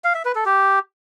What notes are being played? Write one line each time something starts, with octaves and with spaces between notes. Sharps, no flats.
F5
E5
B4
A4
G4